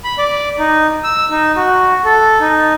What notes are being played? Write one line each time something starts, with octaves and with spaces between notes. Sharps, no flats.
B5
D5
D#4
E6
D#4
F#4
A4
D#4